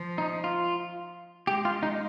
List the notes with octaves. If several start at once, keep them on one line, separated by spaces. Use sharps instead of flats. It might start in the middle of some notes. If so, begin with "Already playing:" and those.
Already playing: F3
D#4
F4
G#3 G4
F4
D#4